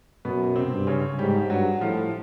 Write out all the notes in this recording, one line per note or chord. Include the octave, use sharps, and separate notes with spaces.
F#2 B2 B3
C3 C4
G2
C#3 C#4
G#2 G3 G4
G2 F#3 F#4
A2 F3 F4